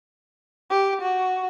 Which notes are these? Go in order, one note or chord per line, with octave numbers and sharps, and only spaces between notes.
G4
F#4